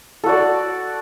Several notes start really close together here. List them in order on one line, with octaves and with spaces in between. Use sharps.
A4 F#4 D5